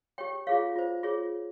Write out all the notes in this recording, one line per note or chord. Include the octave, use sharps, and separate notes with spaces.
G4 C#5 G5
F4 G#4 C#5 F5
F4 C5
F4 G#4 C#5